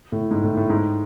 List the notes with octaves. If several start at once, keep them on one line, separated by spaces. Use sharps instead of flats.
A2
G#2
A2
A2
G#2